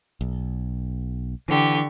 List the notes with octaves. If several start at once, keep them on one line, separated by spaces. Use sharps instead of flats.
B1
D3 E3 G4 C#6